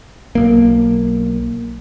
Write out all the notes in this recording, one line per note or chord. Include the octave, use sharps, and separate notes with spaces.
B1 A#3